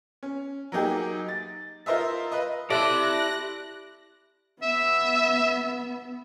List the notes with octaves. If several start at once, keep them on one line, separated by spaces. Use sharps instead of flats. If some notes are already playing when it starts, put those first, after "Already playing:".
C#4
F#3 A#3 D#4 G4 G#4
A6
F4 A#4 C5 D#5 E5
B4 D#5
E4 G4 A4 D5 C6 F#6 A#6
B3 E5